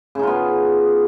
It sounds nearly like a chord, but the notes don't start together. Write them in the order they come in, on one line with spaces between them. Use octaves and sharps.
C#3 D#4 F4 B3